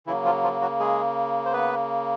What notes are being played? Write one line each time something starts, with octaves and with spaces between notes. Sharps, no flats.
C#3 E3 F#3 A#3 E4
F3 F4
F3 F4
F#3 F#4
G#3 G#4
C5
B3 B4